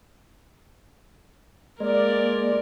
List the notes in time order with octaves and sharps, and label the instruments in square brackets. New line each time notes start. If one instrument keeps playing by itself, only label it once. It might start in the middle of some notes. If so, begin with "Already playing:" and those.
[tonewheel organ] G#3 [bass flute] A#3 [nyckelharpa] A#4 [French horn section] D5